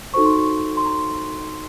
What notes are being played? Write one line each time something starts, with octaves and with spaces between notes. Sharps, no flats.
D#4 F#4 A4 C5 C#6
C6
C#6
C6
A#5